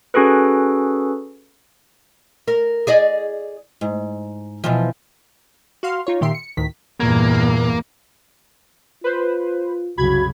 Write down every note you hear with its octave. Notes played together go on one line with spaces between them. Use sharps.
C#4 F#4 G#4 A4 B4
A#4
G#4 D5 D#5
G#2
B2 E3 F3
F#4 F5 C6 F6
D#4 F4 C#5
A#2 D#3 G4 E5 C6 C7
C#7
D2 A2 D#3 B6
E2 G2 A#2 A#3 A#5 G#6
F4 B4 C5
C2 F#2 C#3 F#4 B5 G#6